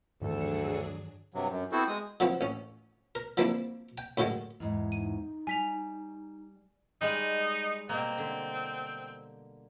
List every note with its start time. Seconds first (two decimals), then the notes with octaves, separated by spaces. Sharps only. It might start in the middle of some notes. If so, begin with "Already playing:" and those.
0.22 D2 G2 D#3 E3 F#3 D4 G#4 A4
1.34 G2 C3 F#3
1.50 F#2
1.72 B3 C4 E4 F#4 A4 C5
1.88 G#3 D#6
2.20 D3 E3 F3 B3 C4
2.41 A1 C#4
3.15 A#4
3.37 F3 G3 A#3 C4 D4 E4
3.98 G5
4.17 F#2 A2 D3 D#3 G#3
4.60 E2 G#2
4.92 D#4 D#7
5.47 G3 G#5 B6 F7
7.01 G3 G#3 D#4
7.89 B2 A#3 C4
8.18 D3